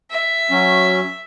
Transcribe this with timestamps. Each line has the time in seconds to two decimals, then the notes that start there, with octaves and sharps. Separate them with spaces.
0.11 E5
0.51 F#3 C#4